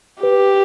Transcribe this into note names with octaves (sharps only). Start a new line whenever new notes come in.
G4 B4